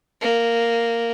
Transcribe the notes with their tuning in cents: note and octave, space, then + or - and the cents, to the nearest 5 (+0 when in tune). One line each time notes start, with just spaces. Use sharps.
A#3 -5